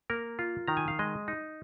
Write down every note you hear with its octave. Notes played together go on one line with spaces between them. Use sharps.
A#3 A#4
F4
D#3 A#5
G#5
F5
G#3 D#5
D#4